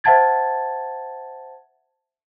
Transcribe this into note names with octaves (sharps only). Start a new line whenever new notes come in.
C5 E5 F#5 A5 G#6 A6